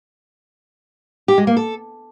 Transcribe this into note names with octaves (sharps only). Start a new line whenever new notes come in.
G4
G#3
A#3
A4